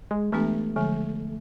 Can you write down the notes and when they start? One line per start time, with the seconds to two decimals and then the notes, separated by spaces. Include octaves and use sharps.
0.11 G#3
0.32 E3 G#3 A3 B3 D4 G4
0.76 D3 F3 G#3